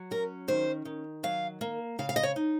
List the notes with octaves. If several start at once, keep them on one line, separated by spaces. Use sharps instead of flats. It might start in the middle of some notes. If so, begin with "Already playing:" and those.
Already playing: F#3
C#4 A#4
D#3 C5
D#3
F#3 F5
A#3
C#3 F5
F5
D#5
C#5
D#4